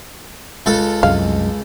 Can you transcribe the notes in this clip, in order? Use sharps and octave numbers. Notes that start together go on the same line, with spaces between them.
C#2 A4
C2 F#2 G#3 F5